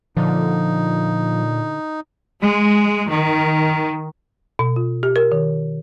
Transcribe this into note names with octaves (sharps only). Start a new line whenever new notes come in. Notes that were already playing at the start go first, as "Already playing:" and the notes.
A#2 D3 F3 D#4
G#3
D#3
B2
F4
G4
A#4
D#3